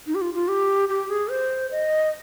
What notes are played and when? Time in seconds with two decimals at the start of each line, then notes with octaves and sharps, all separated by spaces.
0.07 D#4
0.15 G4
0.21 F4
0.34 F4
0.48 G4
0.89 G4
1.10 G#4
1.30 C5
1.71 D#5